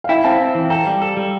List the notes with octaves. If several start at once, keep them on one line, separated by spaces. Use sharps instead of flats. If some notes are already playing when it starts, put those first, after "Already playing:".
F5
E4 E5 G5
C4 F5 A5
C4
E3
A4 G5 A#5
G3
A4
G3